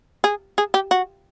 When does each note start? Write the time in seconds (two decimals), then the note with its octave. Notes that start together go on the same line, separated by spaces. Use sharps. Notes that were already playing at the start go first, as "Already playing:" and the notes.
0.24 G#4
0.58 G#4
0.74 G4
0.91 F#4